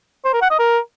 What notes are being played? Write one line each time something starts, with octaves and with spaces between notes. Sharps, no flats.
C5
A#4
F#5
D#5
A#4